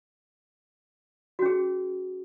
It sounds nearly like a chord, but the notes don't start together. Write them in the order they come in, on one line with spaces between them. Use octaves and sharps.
F#4 C#4 G#4